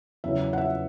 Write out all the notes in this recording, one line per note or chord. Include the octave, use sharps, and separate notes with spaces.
E2 C#3 F#3 E5
F#5
E5